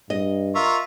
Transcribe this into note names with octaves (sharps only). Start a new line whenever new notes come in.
G2 D#5
F4 A#4 E5 C#6